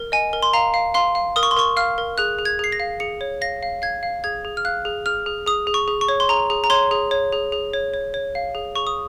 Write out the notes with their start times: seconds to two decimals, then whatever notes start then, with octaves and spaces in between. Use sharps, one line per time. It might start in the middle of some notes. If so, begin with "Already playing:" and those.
Already playing: A#4
0.12 D#5 G#5
0.33 A#4
0.43 C6
0.53 F5 A#5
0.74 F5
0.94 F5 C6
1.15 F5
1.36 A#4 D#6
1.43 C#6
1.51 C6
1.57 A#4 C#6
1.77 F5 F6
1.98 A#4
2.18 G#4 F#6
2.39 G#4
2.45 G#6
2.59 G#4 C7
2.72 A#6
2.80 F5
3.00 G#4 C#7
3.21 C#5
3.41 F5 A#6
3.63 F5
3.82 F5 G#6
4.03 F5
4.24 G#4 G#6
4.45 G#4
4.57 F6
4.65 F5 F#6
4.85 G#4
5.06 G#4 F6
5.26 G#4
5.46 G#4 D#6
5.67 G#4
5.74 C#6
5.88 G#4
6.01 C#6
6.09 C#5
6.20 C6
6.29 G#4 A#5
6.50 G#4
6.64 A#5
6.70 C#5 C6
6.91 G#4
7.11 C#5
7.32 G#4
7.52 G#4
7.74 C#5
7.94 C#5
8.14 C#5
8.35 F5
8.55 G#4
8.76 G#4 C#6
8.87 D#6